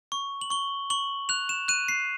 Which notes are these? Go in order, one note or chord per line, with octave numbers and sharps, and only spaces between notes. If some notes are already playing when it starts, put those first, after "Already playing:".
C#6
F#7
C#6 G7
C#6 F#7
F#6 F7
E7
F#6 D#7
C7